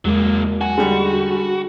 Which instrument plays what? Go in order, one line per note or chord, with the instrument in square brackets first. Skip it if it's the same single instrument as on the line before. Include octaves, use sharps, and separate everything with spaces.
[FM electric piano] E2 G#3 [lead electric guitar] F#3 A#3
[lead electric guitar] F#4 [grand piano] G#5
[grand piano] D3 G3 G#3 [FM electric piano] G#4